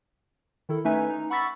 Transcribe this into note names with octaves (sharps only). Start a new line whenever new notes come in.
D#3 E4 A4
A3 C#4 D#4 B4 E5 G#5
D#4
F#5 B5 C#6 E6 A6 B6